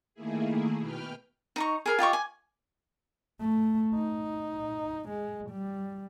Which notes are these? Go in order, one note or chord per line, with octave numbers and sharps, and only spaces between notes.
D#3 A3 A#3 E4 G#4
B2 B4 G5 F6
D#4 A#5 C#6
G#4 A#4 G#5
F4 G4 D#5 C#6
G#5
A3
D#4
G#3
G3